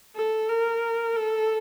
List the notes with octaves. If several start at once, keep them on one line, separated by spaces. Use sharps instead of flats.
A4
A#4
A4